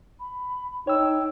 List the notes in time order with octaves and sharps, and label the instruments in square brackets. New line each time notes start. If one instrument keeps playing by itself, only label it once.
[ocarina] B5
[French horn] D#4 [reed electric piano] C#5 E6 [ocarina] G5